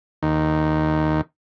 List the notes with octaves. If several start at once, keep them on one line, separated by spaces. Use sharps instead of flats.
D#2